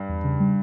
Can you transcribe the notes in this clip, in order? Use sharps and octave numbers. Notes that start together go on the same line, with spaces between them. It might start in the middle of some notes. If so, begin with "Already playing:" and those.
Already playing: G2
E2
C#3
G3